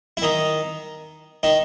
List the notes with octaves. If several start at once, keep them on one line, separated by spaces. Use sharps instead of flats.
E4
D#3 D#4
D#3 D#4